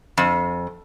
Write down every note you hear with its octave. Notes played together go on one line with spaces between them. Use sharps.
F2